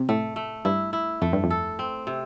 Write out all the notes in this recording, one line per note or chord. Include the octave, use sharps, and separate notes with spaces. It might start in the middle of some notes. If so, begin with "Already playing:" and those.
Already playing: C3
A2 A3
A3
G2 E4
E4
F2 A3
G2
F2
A4
C4
C3